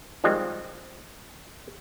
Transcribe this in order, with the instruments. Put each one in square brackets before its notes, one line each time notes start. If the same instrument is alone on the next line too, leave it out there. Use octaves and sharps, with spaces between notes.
[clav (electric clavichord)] D#3 F3 G3 G#3 C4